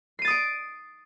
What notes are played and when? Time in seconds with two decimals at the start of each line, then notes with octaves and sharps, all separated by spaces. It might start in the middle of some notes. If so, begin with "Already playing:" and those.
0.19 C7
0.22 D#7
0.25 A6
0.28 D#6
0.30 D7